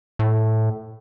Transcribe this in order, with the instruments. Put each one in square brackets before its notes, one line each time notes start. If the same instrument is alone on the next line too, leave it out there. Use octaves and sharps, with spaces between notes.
[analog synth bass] A2